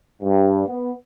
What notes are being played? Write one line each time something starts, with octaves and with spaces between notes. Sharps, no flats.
G2
B3